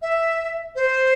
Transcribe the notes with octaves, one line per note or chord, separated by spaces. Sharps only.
E5
C5